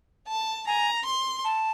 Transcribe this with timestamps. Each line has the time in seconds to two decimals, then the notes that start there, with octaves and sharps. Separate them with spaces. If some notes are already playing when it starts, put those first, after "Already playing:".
0.28 A5
0.67 G#5 A#5
1.06 C6
1.44 A5